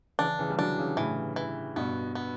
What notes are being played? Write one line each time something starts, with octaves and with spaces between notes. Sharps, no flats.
C#3 E3 D4
C#3 E3
G3
D3 F#3 D4
C#3 E3
A2 C#3 E3
E3
G2 B2 B3
B3